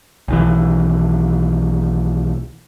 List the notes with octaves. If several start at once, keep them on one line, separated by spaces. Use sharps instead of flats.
B1 D#3 E3